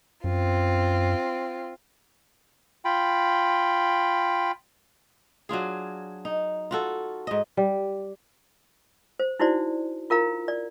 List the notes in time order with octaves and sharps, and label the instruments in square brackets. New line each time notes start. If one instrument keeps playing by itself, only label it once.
[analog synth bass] F#2 [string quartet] C4 F4
[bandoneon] F4 G5 B5
[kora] F#3 D4 F4 G#4
D#4
F4 F#4 A4
G#2 D#5
G3
[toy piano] C5
D#4 E4 F#4 C5 D5
F4 A#4 F5 A#5
D5